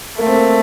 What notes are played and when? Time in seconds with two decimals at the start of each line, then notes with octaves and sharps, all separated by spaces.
0.18 A3 A#3
0.26 C4
0.36 A#3